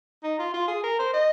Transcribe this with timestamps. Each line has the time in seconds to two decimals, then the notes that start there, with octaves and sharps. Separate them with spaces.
0.23 D#4
0.39 F4
0.54 F4
0.68 G#4
0.83 A#4
0.99 C5
1.14 D#5